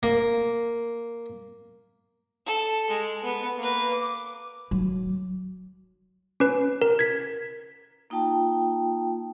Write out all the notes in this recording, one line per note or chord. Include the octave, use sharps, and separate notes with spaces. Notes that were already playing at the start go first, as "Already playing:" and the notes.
A#3
A4 A5
G#3
B3
A#3 B4
D6
F#3
C#4 B4
A#4
G#6 B6
A#3 D#4 F4 G5 A5